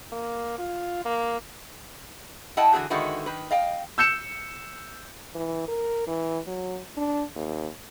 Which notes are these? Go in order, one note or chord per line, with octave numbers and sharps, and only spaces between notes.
A#3
F4
A#3
E4 D#5 F#5 G5 A5
D3 E3 C4 F#4 G#4
D3 D#3 G#3 E4 F#4 B4
D#3 B4
D#5 F5 G5
E6 G6 C#7 E7
E3
A#4
E3
F#3
D4
D#2